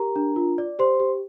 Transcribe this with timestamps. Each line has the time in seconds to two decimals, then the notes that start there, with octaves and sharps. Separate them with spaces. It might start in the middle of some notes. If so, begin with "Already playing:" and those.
Already playing: G4 A#4 A#5
0.16 D4
0.36 F4
0.58 D5
0.79 G4 C5 C6
1.00 G4